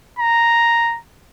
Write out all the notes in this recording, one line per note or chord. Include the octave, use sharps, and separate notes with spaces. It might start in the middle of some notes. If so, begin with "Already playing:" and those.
A#5